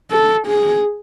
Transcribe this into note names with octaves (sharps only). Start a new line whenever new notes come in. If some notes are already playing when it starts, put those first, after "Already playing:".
A4
G#4